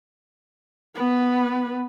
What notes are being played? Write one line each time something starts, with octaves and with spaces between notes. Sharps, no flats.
B3 B4